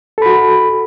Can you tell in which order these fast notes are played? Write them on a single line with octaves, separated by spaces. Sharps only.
A4 B5 F#4